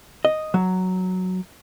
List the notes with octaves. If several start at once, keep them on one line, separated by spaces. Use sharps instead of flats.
D#5
F#3